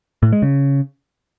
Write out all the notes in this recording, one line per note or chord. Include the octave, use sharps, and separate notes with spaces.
A2
G#3
C#3